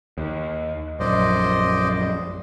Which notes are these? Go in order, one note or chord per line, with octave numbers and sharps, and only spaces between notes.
D#2
A#1 F#2 C5 D5 D#5